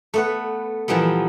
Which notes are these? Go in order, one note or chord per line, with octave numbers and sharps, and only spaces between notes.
A3 B3 B4
A#2 E3 F3 G3 B3